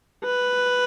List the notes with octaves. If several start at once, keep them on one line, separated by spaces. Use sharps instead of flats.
B4